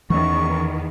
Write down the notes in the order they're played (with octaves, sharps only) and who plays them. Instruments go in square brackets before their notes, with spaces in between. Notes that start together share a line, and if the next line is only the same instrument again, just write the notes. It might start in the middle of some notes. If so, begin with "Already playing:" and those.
[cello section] E2 D#3 [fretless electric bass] E3 C#4 [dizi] C#6